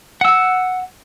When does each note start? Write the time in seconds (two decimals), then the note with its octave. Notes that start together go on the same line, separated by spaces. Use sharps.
0.21 F#5 E6